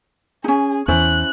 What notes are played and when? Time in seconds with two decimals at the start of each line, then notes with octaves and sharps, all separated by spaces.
0.44 C#4 D#4 G#4
0.88 E2 E3 C#4 E4 C5 F#6